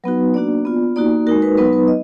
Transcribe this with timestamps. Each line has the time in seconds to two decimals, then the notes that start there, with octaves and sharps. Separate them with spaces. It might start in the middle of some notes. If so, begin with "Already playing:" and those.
0.04 F#3 B3 D#4 F#4 B4
0.34 A#3 D4 F#4 D5
0.65 B3 F4
0.96 A#3 D#4 F#4 D5
1.27 G#3 D#4 F#4 A#4
1.42 B4
1.58 F#3 B3 D#4 B4
1.73 B4
1.88 D#5